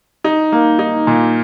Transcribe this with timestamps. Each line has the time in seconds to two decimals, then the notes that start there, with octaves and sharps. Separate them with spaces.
0.24 D#4
0.52 A#3
0.79 D#4
1.07 A#2